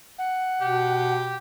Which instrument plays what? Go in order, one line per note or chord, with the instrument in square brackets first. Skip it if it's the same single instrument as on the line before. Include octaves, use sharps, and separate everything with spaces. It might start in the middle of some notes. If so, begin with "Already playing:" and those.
[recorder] F#5
[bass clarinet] B2 [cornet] G4